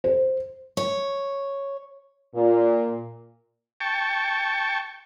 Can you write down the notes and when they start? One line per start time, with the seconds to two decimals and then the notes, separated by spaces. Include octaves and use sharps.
0.04 C5
0.77 C#5
2.35 A#2
3.80 G5 A5 C#6